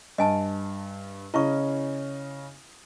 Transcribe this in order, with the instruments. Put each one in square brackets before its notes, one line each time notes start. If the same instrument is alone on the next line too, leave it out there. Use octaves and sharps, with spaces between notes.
[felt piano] G2 [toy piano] D#5 G#5 A5
[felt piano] C#3 C#4 D#5 [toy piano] E4 C#6